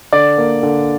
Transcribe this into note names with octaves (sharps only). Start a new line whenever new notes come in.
D3 D5
A#3
D3